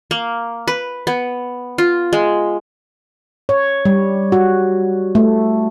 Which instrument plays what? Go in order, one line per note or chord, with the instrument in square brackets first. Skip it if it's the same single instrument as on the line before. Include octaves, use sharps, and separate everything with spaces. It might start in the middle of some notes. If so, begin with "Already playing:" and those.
[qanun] A#3
B4
B3
F4
G#3
[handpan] C#5
G3
F#4
A3